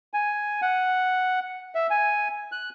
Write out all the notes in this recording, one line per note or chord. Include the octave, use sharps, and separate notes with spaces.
G#5
F#5
E5
G#5
F#6